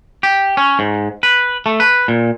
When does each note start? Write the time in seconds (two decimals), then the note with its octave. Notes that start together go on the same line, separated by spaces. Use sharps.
0.23 G4
0.57 C#4
0.79 G#2
1.23 B4
1.66 A3
1.80 B4
2.08 A#2